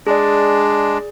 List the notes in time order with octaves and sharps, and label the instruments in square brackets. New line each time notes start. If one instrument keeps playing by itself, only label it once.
[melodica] G#3 D4 [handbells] G#4 D5